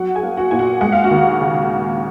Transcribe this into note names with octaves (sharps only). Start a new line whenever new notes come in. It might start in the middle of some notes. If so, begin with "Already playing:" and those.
Already playing: F#3 F#4 F#5
G#4 G#5
A#3
F#4 F#5
A#2 G#5
F#4 F#5
G#3 F#5
F5
F#4 F#5
D#2
C#3